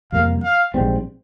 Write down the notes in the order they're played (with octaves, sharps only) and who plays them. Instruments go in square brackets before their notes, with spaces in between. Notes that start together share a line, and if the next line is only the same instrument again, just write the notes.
[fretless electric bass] F2 C3 G3 A#3 [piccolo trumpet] F5
[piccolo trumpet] F5
[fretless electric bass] A#1 G#2 G3 C4